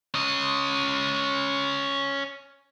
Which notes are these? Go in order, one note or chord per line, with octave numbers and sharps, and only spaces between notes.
C#4 D#5